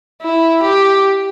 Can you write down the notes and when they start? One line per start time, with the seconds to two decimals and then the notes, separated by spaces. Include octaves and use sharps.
0.21 E4
0.63 G4